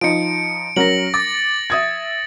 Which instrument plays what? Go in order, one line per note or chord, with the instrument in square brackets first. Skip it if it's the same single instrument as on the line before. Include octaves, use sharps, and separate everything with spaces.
[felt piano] F3 D#4 [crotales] C#7 D7
[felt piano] F#3 C#4 A#4 [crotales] A#6 F#7
[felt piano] D6 [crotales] A6
[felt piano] E5 D#6 G#6